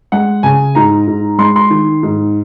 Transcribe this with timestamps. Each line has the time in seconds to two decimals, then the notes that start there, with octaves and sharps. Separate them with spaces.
0.12 G#3 F#5
0.43 C#3 G#5
0.75 G#2 A#5
1.07 G#2
1.38 G#3 C6
1.56 C6
1.70 D#3
2.03 G#2